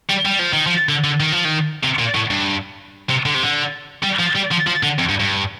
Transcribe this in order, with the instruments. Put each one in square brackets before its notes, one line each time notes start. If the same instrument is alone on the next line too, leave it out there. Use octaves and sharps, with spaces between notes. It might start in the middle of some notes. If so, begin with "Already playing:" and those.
[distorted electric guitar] G3
G3
F3
D#3
F3
D3
D3
D#3
F3
D#3
C3
A#2
A2
G2
C3
D3
C3
D3
G3
F3
G3
F3
F3
D3
F2
G2
G2